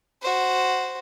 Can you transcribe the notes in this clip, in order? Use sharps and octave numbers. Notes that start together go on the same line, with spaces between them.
F#4 C5